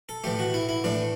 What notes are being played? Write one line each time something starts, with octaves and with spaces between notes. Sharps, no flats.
A4
A2 E3 A3 G4
F#4
E4
E4
A2 E3 A3 D4